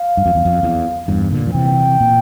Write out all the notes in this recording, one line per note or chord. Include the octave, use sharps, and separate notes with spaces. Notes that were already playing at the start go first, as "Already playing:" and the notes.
Already playing: F5
G2
F2
E2
F2
E2
E2 G2
A#2 D3
F3
C3 E3 G5
A#2